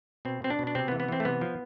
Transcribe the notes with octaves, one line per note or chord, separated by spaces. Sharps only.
B2 C4
B2 C4
D4
B2
D4
C3 C4
B3
E3
B3
E3 C4
A3
C3 B3
F3